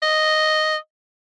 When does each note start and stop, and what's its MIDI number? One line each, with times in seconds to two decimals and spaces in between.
0.02 0.76 75